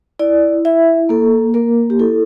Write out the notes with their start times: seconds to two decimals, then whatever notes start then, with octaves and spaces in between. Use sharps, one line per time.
0.19 E4 D5
0.65 E4 E5
1.09 A#3 A4
1.54 A#3 A#4
1.90 G4
1.99 E4 A4